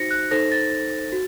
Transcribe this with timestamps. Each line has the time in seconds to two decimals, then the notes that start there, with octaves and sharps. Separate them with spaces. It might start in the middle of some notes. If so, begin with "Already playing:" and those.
Already playing: D#4 F#4 C5 A#6 C#7
0.11 F#6
0.31 D#4 A4 C5 A#6
0.52 A6
1.12 F#4